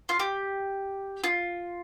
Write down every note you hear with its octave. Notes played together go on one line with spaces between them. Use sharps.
F4
G4
F4